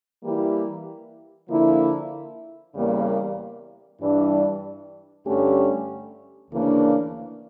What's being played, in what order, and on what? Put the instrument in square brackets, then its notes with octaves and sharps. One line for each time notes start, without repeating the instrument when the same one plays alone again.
[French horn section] E3 G3 A#3 E4 G4
D3 F3 A#3 E4
E2 C#3 G3 A#3
G2 E3 G3 D4
G2 D3 A3 C#4 G4
D2 C#3 E3 A#3 D4